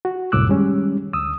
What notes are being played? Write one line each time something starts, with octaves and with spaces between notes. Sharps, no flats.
F#4
C2 F#2 A2 D6 E6 F#6
D#3 G3 G#3 C#4
D2 D#6 E6